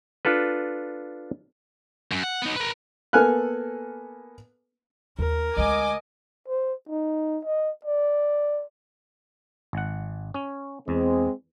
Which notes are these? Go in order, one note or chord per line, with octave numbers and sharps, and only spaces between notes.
D4 F4 A4 B4
F#2
F#5
B3 D#4
A#4 B4
A#3 B3 A4 G#5 F6 F#6
D#2 A#4
D2 G#3 D#5 G#5 D6
C5
D#4
D#5
D5
G#1 F#5
C#4
E2 G#3 C4